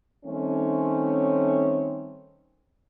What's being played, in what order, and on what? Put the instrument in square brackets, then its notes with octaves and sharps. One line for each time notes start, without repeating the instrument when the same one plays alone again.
[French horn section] D#3 G3 A3 C4 C#4